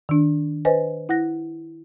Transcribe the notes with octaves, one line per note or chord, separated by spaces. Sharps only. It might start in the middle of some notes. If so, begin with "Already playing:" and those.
D#3 D4
B4 C5 D#5 G#5
E4 F#5 F#6 A#6